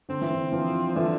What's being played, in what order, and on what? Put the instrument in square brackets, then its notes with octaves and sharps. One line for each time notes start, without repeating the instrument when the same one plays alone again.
[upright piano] D3 [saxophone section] C4
[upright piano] E3
D3
[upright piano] E3 [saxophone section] F3
[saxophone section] D3 [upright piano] E3